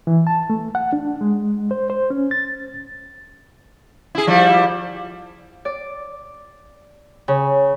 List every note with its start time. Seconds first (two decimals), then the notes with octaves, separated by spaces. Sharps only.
0.07 E3
0.27 A5
0.50 A3
0.75 F#5
0.93 D4
1.21 G#3
1.71 C5
1.90 C5
2.10 C#4
2.31 A6
4.15 E4 G#4
4.27 F3 G3 E4
5.65 D5
7.28 C#3